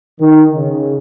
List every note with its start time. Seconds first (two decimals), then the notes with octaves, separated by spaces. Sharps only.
0.21 D#3
0.54 C#3